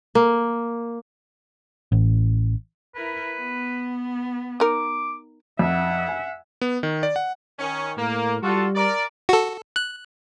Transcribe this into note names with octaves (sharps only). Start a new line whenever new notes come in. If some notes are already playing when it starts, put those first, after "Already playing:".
A#3
A1
E4 A#4 B4
B3
D#4 A#4 D6
F2 E5 F#5
G#5
B3
D#3
D5
F#5
D#3 C#4
A2 A#3
G3 F4 F#4 A4
A#4 D5
F#4 A4
F#6